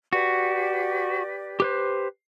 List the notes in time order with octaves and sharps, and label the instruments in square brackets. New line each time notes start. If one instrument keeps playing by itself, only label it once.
[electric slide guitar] F#4 [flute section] G4 B4 D5
[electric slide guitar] G4 B4 C5